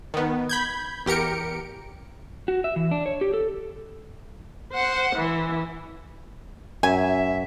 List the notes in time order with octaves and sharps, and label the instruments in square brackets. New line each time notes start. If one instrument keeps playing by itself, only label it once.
[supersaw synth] D#3 B3
B5 G6 G#6
E2 G4 A#4 C#7 D7
[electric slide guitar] F#4
E5
E3
D4
C#5
G4
A4
[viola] C5 F#5
E3
[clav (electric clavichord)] F#2 [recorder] E5 [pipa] G#5